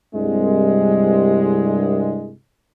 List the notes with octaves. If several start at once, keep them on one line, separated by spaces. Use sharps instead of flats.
C2 G2 G#3